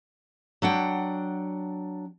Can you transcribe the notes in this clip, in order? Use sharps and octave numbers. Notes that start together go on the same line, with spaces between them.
F#3 D4 F#5 G5